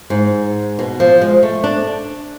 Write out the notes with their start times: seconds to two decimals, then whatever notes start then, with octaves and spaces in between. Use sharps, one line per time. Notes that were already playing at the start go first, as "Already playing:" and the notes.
0.10 G#2
0.79 B2
1.00 F3
1.22 G#3
1.43 A3
1.64 D4